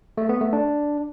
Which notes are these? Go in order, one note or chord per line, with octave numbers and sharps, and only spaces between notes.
A3
B3
A3
D4